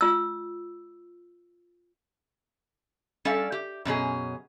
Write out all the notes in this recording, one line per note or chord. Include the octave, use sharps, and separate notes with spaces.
F4 E6
G3 C#4 A4 D5 E5 F5
G4
F#2 B2 C#4 G#4